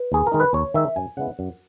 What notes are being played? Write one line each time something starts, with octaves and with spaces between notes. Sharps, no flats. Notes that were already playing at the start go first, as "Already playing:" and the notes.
Already playing: B4
D#2 G#4
A#4
D#3 G#3 D#4
B4
D#2 C#5
D#3 G#3 D#4 E5
F#2 G#5
C#3 G#3 B3 E4 F#5
F#2